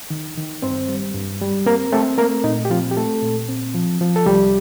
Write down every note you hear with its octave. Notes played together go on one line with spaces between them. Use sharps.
D#3
D#3
G2 C4 C5
G3
G2
G3
A#3 C4 A#4
A3 C4 A4
A3 A#3 A#4
A#2 D#4
G4
F3 C4 F4
G4
A3 A4
A#2
C4
F3
F3
A4
C2 G3 G4